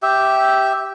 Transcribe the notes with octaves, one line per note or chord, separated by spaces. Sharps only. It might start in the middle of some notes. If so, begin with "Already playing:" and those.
G4 E5